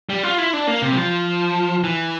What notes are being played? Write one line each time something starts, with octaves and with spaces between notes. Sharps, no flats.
G3
F4
E4
D4
A#3
C3
G3
F3
E3